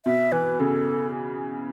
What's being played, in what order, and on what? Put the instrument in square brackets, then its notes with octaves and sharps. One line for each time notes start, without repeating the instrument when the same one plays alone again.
[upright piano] B2 [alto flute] E5
[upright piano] E3 [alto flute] B4
[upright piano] C#3 [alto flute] A4